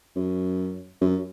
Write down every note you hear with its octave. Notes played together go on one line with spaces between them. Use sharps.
F#2
F#2